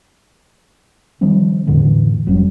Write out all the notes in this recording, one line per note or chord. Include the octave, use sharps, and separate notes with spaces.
D#3 F3 G3 C4
E2 A2 D3 E3
F1 F#3 G3 C#4